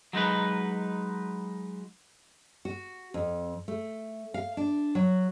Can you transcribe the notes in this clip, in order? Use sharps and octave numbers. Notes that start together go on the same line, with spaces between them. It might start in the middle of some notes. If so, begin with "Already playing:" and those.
F#3 G#3 D#4 B4
F#4
F2
A3
F5
D4
F#3